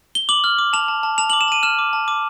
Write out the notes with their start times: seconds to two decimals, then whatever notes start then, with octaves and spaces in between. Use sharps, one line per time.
0.15 G7
0.29 D6 F#7
0.44 F6
0.58 D6
0.73 A5 F7
0.88 A5
1.03 A5
1.18 A5 F7
1.30 D6 F#7
1.41 E7
1.48 A5 D#7
1.63 F6 E7
1.79 D6
1.93 A5
2.08 D6